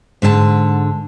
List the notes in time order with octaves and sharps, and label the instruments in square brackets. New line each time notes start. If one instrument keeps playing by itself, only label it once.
[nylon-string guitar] G#2 D3 A#4 A5